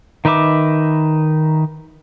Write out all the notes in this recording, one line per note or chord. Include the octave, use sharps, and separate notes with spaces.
D#3 D#4 B4 E5 D6